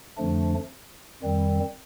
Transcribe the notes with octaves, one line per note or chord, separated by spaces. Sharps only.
F2 D3 F3 A3 D4
F2 D#3 G3 C4